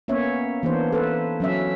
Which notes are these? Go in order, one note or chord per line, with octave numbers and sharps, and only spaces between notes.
A#3 B3 C#4 C#5 E5
E3 A#3 B3 D4 C5
A4 B4
F#3 C#4 E5